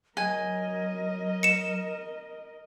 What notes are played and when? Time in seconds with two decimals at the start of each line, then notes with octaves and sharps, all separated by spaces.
0.17 F#3 A#4 D#5 G#5
1.43 C#7 E7